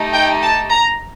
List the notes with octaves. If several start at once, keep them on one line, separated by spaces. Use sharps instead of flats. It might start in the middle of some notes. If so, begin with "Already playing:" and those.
Already playing: A3 D#4 G4
G5
A5
A#5